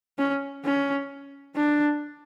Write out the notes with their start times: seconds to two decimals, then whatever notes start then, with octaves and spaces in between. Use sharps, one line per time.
0.18 C#4
0.65 C#4
1.56 D4